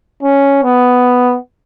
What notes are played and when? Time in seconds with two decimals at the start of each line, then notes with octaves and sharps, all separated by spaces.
0.23 C#4
0.64 B3